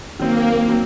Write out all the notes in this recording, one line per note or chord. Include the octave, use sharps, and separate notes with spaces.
D#3 F#3 A#3 C4
D#3 F#3 C4